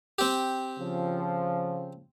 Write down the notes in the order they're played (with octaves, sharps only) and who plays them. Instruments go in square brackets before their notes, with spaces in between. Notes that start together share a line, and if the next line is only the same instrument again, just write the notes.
[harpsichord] C4 G4
[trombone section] C#3 F3